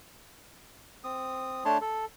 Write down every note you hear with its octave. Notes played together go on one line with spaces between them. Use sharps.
C4 D#6
A3 D4 C#5 A5 C6
A4